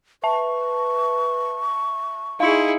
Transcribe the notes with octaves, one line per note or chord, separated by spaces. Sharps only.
B4 E5 A5 C#6
D#4 E4 G#4 F5 C6 C#7